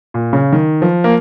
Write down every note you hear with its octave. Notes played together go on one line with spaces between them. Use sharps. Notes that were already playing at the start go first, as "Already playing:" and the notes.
A#2
C#3
D#3
F3
A#3